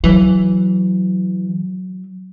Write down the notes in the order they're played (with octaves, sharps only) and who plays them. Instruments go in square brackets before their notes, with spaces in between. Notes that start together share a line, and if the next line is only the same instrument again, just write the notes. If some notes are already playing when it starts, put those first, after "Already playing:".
[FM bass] E3 [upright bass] F#3